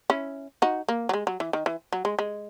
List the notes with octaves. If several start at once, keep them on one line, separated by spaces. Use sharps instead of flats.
C#4 E4
D#4 F#4
A#3
F#3
G#3
F#3
E3
D#3
E3
F#3
G#3
G#3